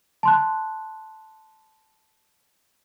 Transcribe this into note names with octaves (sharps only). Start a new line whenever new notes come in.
A5 C6 F#6